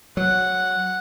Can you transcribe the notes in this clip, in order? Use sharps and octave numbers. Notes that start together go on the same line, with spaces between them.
F#3 F#5